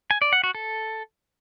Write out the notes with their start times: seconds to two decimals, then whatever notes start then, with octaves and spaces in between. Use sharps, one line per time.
0.11 G#5
0.22 D5
0.33 F#5
0.44 F#4
0.55 A4